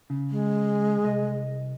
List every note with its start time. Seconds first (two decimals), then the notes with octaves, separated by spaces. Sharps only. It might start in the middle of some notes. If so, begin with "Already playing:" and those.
0.10 C#3
0.30 G#3
1.04 C2 D#5